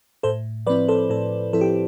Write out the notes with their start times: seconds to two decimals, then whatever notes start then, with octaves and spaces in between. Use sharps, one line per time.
0.23 A2 A4 C5
0.67 F3 B4 D5
0.70 C4 E4
0.88 A4 C5
1.10 A2 A4
1.53 F3 C4 E4 A4
1.61 G4